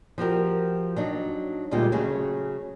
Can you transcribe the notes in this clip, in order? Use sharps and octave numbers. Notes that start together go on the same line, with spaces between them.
F3 F#4 G4 A#4
F#3 D4 D#4
D2 A#2 G3 G#3 F4 G4
C#3 F#3 A3 C#4 G#4